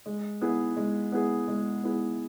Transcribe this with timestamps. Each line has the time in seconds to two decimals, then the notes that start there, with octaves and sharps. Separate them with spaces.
0.06 G#3
0.41 B3 E4 G#4
0.77 G#3
1.12 B3 E4 G#4
1.48 G#3
1.84 B3 E4 G#4